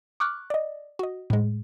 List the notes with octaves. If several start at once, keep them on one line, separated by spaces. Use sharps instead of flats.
C#6 D6 F6 F#6
D5 D#5
F#4 D#5
A2 G#3